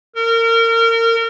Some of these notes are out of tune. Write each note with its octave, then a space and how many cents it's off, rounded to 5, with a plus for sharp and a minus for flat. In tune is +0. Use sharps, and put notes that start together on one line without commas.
A#4 -30